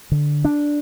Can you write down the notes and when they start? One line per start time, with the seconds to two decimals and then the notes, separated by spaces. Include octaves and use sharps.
0.12 D3
0.45 D4